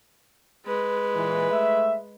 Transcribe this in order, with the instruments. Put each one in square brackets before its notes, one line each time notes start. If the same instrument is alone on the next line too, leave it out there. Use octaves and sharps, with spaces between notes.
[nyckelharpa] G#3 B4
[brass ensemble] A#2 E3
A3 E5